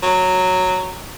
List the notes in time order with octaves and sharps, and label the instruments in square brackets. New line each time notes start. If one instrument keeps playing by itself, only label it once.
[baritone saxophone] F#3